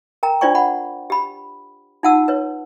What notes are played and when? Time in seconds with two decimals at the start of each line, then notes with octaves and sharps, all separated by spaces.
0.23 A#4 G5 A#5
0.41 D4 F4 C5 D5 G5 C#6
0.55 F#5 B5
1.10 G4 B5
2.03 D#4 F4 F#5 A5 E6
2.28 B4 C#5